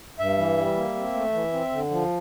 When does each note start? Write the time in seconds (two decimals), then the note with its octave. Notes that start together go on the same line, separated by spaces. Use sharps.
0.19 G2 E5
0.38 E3
0.57 G3
0.76 A#3
0.95 C4
1.14 A3
1.33 E3
1.53 C4
1.72 D3
1.91 F3